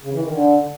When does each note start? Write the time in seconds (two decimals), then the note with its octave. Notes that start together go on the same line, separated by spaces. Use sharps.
0.03 C#3
0.12 E3
0.22 D#3
0.31 D3